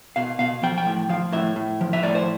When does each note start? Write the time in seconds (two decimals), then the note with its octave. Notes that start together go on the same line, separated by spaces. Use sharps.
0.16 B2 F5
0.39 B2 F5
0.63 F3 G5
0.78 G5
0.86 A2
1.09 F3 F5
1.32 A2 E5
1.56 A2
1.81 F3
1.93 E5
2.03 A2 D5
2.15 C5